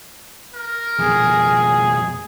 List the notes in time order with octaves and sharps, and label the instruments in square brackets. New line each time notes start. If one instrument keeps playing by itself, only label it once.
[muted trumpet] A#4
[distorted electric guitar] F2 B2 [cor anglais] G#4